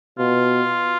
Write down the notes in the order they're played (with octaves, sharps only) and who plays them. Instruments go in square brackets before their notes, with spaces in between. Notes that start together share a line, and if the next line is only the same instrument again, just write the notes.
[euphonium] B2 [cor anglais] F4